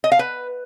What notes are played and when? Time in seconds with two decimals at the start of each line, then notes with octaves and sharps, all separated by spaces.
0.04 D#5
0.12 F5
0.19 B4